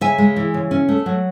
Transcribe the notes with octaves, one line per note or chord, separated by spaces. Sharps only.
C#3 E5 G#5
G#3
E3
C#3
C#4
A3
F#3